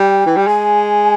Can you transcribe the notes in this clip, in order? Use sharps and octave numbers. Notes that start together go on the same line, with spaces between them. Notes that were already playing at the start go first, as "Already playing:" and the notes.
Already playing: G3 G5
E3
G3
G#3 G#5